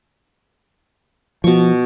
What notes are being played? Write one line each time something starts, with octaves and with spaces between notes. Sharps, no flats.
B2 F3 C#6